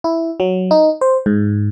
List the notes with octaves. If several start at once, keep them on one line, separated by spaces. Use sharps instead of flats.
E4
F#3
D#4
C5
G#2